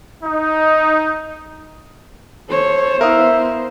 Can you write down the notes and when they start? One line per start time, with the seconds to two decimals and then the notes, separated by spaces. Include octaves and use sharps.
0.22 D#4
2.50 A4 C5 C#5
3.01 B3 E4 A#4 E5 F5 D#6